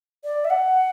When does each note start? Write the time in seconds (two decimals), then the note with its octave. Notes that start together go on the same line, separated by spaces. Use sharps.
0.24 D5
0.45 E5
0.50 F#5